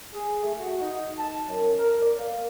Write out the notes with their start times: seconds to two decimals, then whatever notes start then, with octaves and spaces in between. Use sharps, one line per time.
0.12 G#4
0.43 A3
0.59 F#4
0.81 D#4
1.18 A5
1.48 F#2
1.79 A#4
2.02 D5
2.19 A#3